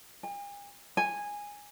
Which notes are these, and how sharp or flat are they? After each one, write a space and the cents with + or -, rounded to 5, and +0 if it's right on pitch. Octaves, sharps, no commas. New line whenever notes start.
G#5 -45
G#5 -10